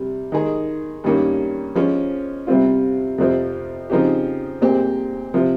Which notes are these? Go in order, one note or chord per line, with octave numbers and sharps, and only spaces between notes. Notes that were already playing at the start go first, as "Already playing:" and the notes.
Already playing: C3 G3
D#3 G#3 D#4 G#4
G2 D#3 A#3 C#4 G4
F3 G#3 C#4
C3 G3 C4 F4
F2 C3 F3 C4
C#3 F3 C4 D#4 G4
A#2 G#3 C4 G4
C3 F3